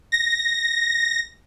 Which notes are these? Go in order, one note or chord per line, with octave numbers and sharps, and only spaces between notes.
A#6